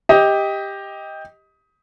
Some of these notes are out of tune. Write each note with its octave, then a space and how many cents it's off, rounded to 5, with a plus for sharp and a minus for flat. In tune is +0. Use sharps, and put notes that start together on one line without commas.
G4 +10 D#5 +20